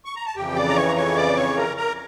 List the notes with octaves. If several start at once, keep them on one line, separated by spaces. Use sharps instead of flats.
C#6
A#5
A5
F2 C#3 E3 G4 G5
D5 D6
A#5
C#5 C#6
A#5
C#5 C#6
D5 D6
C#5 C#6
A#4 A#5
A#4 A#5